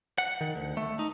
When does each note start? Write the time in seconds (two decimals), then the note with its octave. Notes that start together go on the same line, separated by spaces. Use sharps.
0.18 F#5
0.41 D#3
0.56 D2
0.77 A3
0.99 D#4